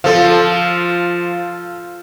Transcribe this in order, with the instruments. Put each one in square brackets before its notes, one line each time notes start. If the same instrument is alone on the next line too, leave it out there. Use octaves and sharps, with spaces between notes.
[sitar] F3 [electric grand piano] F4 A4 F5